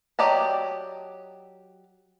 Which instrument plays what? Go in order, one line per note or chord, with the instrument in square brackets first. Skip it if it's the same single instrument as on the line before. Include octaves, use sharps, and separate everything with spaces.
[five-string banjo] F#3 G4 D5 D#5 A5